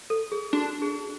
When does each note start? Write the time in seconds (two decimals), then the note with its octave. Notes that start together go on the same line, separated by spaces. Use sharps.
0.10 A4
0.32 G#4
0.53 D4 F#4
0.82 G#4